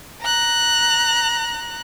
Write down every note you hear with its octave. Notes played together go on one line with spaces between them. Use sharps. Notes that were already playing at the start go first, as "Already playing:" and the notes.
A#5 F#6